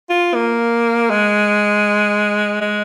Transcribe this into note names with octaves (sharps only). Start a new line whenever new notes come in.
F4
A#3
G#3
G#3